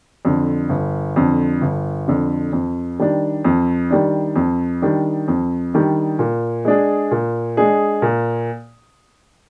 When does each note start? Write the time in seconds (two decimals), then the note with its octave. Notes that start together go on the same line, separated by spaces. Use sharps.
0.25 F2 D3
0.69 G1
1.16 F2 D3
1.61 G1
2.08 F2 D3
2.53 F2
2.99 D#3 G3 D4
3.45 F2
3.90 D#3 G3 D4
4.36 F2
4.82 D#3 G3 D4
5.28 F2
5.74 D#3 G3 D4
6.19 A#2
6.65 G#3 D4 G#4
7.11 A#2
7.57 G#3 D4 G#4
8.02 A#2